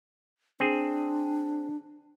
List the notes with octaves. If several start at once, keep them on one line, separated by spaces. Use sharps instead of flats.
C4 D4 G#4